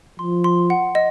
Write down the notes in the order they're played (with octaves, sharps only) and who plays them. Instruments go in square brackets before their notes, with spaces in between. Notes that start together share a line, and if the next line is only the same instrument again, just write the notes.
[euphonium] F3 [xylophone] C6
[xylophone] C6
F#5
D#5